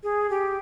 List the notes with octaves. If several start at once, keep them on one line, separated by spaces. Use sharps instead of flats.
G#4
G4